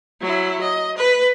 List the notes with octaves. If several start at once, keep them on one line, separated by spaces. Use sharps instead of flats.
F#3 E4
D#5
B4